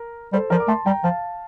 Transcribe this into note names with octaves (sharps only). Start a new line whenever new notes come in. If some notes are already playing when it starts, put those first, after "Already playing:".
Already playing: A#4
G3 A4 C5
F3 A#4 D5
D6
A3 A5 C6
G3 G5 A#5
F3 F5 A5